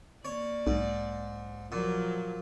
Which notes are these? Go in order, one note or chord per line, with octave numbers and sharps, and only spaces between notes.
A#3 C#5 D5
B1 G#2
A#2 F3 F#3